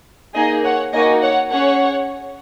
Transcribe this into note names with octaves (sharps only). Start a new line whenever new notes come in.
A#3 D#4 G#4 D#5 G#5
C#5 F#5
A#3 D#4 F#4 D#5 G#5
C#5 F#5
C#4 G#4 C#5 F#5